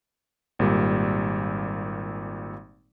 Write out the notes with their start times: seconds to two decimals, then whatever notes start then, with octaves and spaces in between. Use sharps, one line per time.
0.59 G#1 A#2 G3